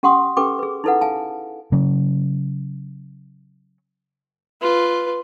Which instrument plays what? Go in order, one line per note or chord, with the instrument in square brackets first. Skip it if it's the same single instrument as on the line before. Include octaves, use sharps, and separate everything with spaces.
[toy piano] C#4 G4 F#5 G5 C6 D#6
C#4 G4 A4 B4 G5 D6
G#4 B4
D#4 E4 A4 B4 F#5
F5 G#5 A5
[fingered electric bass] C#3 F#3 C#4
[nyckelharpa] F4 B4